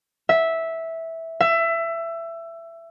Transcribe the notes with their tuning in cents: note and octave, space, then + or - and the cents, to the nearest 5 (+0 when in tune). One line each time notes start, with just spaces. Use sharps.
E5 -10
E5 +20